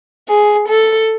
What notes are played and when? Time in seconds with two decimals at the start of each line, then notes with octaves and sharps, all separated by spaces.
0.28 G#4
0.68 A4